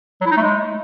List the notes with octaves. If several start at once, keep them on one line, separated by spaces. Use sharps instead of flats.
F#3
E4
D#4
A3
G#3